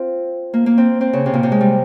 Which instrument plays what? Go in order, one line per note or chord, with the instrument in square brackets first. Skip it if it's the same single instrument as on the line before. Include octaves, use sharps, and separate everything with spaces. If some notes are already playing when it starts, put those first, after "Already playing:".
Already playing: [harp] C4 F4
A#3
A#3
C4
C4
C#3
C3
A#2
C3
G#3
G3